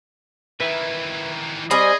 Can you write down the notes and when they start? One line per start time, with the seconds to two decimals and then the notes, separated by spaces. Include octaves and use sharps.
0.60 D#3 E3 B4 E5
1.71 G3 C4 G#4 D#5 G#5 B5